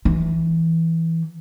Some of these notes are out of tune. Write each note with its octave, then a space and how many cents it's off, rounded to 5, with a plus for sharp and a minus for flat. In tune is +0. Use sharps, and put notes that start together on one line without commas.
E3 -5